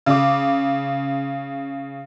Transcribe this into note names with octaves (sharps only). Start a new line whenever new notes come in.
C#3 D6